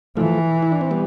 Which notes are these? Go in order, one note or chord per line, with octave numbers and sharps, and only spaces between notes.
E3 F3 A3
E4
D4
C4
G3 B3